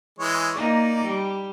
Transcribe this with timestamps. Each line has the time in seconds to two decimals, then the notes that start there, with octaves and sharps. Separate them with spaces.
0.19 E3 G#3 C#5
0.55 A#3 D#4 D5
1.05 G3